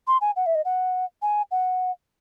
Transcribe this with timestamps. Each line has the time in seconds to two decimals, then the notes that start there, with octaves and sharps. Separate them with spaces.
0.07 C6
0.21 G#5
0.36 F#5
0.46 E5
0.55 D#5
0.65 F#5
1.22 G#5
1.51 F#5